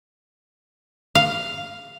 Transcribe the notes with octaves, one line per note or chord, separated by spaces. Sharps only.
F5